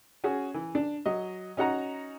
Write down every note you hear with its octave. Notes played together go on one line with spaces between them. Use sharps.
C#4 F#4 G#4
E3
D4
F#3 D#5
C#4 D#4 F#4 F#5 A#5